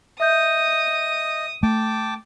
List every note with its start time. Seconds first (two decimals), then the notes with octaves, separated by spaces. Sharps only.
0.20 D#5 E5 D#6 G6
1.63 A3 G5 A5 D6